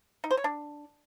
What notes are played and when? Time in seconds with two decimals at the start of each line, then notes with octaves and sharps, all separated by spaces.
0.24 D#4
0.31 C5
0.37 C#5
0.44 D4